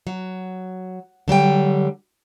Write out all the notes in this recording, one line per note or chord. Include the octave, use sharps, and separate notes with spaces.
F#3
D3 F#3 G3 G5